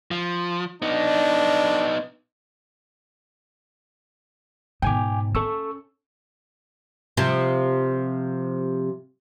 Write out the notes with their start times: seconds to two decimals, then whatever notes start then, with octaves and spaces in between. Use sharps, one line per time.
0.11 F3
0.82 B3 D4 D#4
4.82 G#2 B2 G5 G#5 D6
5.35 C#4 A4 C#6 E6
7.17 C3 F3